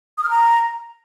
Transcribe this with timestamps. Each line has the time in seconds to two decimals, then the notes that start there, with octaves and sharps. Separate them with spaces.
0.18 D#6
0.24 F6
0.30 A#5